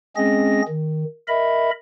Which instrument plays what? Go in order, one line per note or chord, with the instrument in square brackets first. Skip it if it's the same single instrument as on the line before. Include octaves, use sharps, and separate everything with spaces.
[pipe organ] G#3 C4 C#4 G#4 D#5 A#6
D#3
A#4 D#5 E5 B5